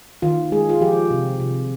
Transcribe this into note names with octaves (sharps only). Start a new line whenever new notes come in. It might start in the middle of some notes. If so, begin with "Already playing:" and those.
D#3 F4
G#3 G#4
F4
F3 G4
C3
C3